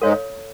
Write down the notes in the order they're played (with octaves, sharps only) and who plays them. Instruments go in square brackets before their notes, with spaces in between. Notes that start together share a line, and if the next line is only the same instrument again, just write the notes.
[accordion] G#2 G#3 [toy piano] A4 C#5 F5